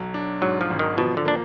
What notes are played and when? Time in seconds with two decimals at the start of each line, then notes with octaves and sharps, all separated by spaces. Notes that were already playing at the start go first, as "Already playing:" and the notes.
Already playing: B1 F#3
0.14 D4
0.41 G#2 F#3
0.61 F3
0.70 G#1
0.79 D#3
0.97 B2 F3
1.17 D3
1.25 A#3 D4